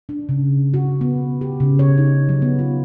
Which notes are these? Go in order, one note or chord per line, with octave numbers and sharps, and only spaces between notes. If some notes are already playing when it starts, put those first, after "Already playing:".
D4
C#3
F#4
B3
G4
C#3
C#5
D#4
F#3
B3
F4